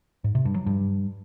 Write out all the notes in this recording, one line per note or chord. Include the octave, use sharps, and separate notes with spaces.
G#2
C3
G2
F#3
G2